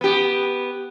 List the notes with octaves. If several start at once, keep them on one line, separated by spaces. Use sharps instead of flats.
B3 G4